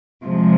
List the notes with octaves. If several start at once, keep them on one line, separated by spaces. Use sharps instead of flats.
C3 F3 G#3